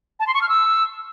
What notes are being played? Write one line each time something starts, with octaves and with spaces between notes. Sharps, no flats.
A5
C6
C#6
F6
E6